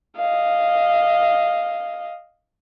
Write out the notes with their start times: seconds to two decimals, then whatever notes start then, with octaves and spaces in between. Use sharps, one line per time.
0.17 D#5 F5